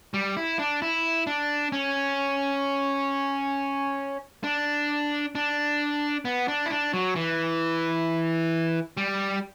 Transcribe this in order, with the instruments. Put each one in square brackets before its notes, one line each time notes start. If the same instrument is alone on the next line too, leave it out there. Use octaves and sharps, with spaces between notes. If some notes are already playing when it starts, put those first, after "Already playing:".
[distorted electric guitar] G3
E4
D4
E4
D4
C#4
D4
D4
B3
D4
E4
D4
F#3
E3
G3